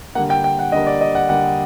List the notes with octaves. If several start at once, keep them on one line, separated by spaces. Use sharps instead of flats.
D3 G3 A#3 F#5
G5
G5
F#5
D3 G3 A#3 D#5
D5
D#5
F#5
D3 G3 A#3 F#5